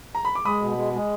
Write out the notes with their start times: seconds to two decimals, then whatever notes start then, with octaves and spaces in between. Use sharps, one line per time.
0.15 A#5
0.25 B5
0.35 D6
0.45 G#3 B5 D#6
0.62 B2
0.77 G#3
0.94 G#3